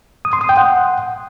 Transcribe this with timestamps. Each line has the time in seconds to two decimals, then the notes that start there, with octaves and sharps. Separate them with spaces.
0.25 D#6
0.33 C6
0.41 D#6
0.49 G5
0.57 F#5